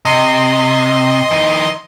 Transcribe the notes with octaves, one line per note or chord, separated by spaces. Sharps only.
C3 D#5 C6
E3 D#4